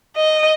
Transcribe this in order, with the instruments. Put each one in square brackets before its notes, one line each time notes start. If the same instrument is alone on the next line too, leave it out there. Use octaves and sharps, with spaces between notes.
[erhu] D#5